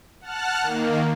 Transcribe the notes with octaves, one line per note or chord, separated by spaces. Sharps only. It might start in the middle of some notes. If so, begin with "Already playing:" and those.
F#5 A5 F6 F#6
D#3 A#3